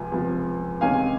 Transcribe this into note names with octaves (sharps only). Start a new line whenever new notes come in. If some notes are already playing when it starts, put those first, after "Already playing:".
Already playing: C#2 C3 F3 G#5
C#2 C3 F3
C3 D#3 G#3 C#4 F5 G#5